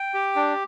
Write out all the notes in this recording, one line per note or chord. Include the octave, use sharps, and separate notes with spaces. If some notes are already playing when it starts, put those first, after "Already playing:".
Already playing: G5
G4
D4